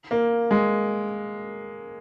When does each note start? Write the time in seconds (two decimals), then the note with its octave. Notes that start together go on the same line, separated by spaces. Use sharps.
0.11 A#3
0.51 G#3